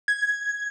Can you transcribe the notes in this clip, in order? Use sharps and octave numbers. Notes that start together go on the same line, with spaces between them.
G#6